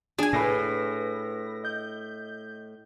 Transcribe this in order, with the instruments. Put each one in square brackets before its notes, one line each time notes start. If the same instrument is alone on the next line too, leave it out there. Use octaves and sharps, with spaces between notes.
[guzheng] D4 G#5 [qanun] G#4 [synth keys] D#7
[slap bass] A2 [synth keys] B4 A#6
[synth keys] D#5 G6